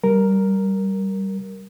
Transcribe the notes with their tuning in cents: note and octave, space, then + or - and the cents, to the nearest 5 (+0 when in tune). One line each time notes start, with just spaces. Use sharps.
G3 -15 A#4 +0